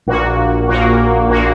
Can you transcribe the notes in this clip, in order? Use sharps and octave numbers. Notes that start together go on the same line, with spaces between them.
A#1 A#2 A#3 F#4
A#1 A#2 A#3 F#4
A#1 A#2 A#3 F#4